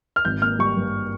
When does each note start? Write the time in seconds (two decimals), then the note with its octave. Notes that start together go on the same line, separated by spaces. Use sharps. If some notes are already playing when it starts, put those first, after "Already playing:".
0.16 F6
0.25 G#1 G6
0.42 A#3 F6
0.59 G3 C#6
0.77 G2